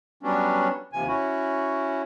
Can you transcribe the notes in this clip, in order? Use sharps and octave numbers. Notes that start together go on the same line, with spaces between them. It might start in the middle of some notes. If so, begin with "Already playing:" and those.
F#3 G3 B3 C#4 D4
D#2 C3 F3 G#5
C#4 E4 F#4